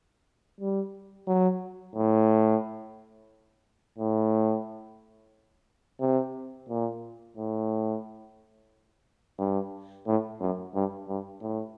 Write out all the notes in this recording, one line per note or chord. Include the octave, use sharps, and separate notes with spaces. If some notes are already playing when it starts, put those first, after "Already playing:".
G3
F#3
A2
A2
C3
A#2
A2
G2
A2
F#2
G2
G2
A2